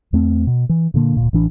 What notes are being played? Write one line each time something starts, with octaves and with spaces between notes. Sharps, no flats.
E2 A3 C4
B2
E3
A#2 D3 A#3
D1 A#2
A1 E3 D4